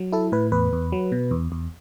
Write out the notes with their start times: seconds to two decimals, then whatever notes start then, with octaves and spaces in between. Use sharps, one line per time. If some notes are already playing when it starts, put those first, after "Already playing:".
Already playing: F#3
0.13 E4 A4
0.32 A2 B4
0.52 E2 B4
0.73 E2
0.92 F#3
1.12 B2
1.31 E2
1.52 E2